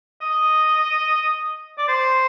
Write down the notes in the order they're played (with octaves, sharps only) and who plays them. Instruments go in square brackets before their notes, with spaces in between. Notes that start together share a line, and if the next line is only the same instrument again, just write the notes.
[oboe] D#5
D5
C5